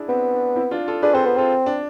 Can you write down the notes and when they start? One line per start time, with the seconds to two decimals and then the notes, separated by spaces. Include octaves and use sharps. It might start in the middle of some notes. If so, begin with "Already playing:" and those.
Already playing: D4 E4 G#4
0.09 B3 C4
0.33 D4
0.56 C4 E4
0.71 D4 F4
0.88 F4 A4
1.02 D4 G#4 B4
1.14 C4 A4 C5
1.25 B3
1.37 C4 F4 A4
1.66 D4